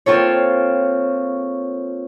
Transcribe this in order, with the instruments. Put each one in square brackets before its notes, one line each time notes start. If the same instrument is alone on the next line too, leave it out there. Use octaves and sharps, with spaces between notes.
[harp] A#3 C4 F4 A4 C#5